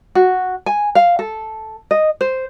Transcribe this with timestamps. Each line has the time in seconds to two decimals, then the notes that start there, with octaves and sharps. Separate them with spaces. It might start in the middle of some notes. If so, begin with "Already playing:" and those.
0.15 F#4
0.66 G#5
0.95 F5
1.19 A4
1.91 D#5
2.21 C5